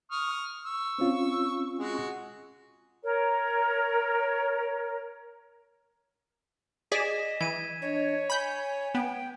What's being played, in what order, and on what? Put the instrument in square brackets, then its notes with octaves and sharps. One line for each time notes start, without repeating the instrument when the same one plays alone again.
[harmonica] C#6 D#6 F6
C#6 E6
[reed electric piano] C4 C#4 F4
[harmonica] G#3 F#4 G#4
[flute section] A#4 C#5
[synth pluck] G#4 D5 [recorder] D#5 [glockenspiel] B6 E7
[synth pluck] E3 [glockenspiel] G#6 D#7
[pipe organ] D4 D#5 [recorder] C#5
[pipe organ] G#5 [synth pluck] B5 G6
[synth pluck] B3 [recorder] G5